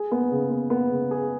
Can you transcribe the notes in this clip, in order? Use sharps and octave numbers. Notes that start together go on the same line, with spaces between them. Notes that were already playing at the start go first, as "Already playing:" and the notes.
Already playing: G#4
B3
C#3
B3
B3
C#3
G#4